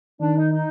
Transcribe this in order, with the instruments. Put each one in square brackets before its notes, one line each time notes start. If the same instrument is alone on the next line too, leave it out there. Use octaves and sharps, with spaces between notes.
[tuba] D#3 [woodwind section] D4
[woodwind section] D#4
D#4